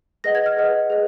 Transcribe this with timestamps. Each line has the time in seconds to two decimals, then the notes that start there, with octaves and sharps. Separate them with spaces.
0.24 G#4 B4 D#5 F#5 A#6
0.35 G#6
0.46 F6
0.57 G#4 B4 D#5 F#5
0.90 G#4 B4 D#5